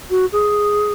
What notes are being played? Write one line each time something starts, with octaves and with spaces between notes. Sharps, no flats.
F#4
G#4